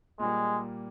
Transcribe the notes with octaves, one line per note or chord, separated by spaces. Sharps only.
A#2 G3 G#3 A#3